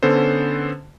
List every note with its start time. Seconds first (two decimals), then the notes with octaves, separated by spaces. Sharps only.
0.03 D3 B3 C#4 A4 C5